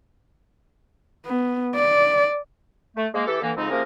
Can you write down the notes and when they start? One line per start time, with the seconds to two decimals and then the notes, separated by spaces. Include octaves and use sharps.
1.26 B3
1.75 D5
2.96 A3
3.14 G#3 A#3
3.27 E3 G4 A4
3.42 D3 E3 A#3
3.57 F2 G#2 C#3 G#3 C4 D#4
3.70 C3 F3 A#3 C#4 G#4 A#4